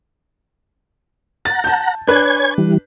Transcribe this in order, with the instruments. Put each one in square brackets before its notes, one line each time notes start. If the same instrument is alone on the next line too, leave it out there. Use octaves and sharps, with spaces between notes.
[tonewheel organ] F#5 A#5 [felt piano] A6
[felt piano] A5 G6
[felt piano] D4 B4 [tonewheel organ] C#5 G#5 G#6
[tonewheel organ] E3 G3